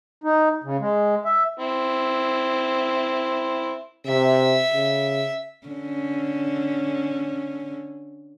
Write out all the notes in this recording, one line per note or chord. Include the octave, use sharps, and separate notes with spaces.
D#4
C#3
G#3
E5
C4 E4
C3 E5
C#3
D3 C#4